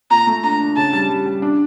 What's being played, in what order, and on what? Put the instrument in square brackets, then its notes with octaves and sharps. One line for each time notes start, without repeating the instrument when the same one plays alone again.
[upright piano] A#2 [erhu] A#5
[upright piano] A3
[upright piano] D4 [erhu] A#5
[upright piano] D4
[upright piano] C#3 [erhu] A5
[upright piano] G3
G3
G3
D4